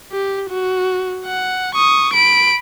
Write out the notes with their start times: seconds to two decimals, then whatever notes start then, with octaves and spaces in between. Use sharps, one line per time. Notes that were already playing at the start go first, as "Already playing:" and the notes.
0.13 G4
0.50 F#4
1.25 F#5
1.75 C#6 D#6
2.13 B5 D7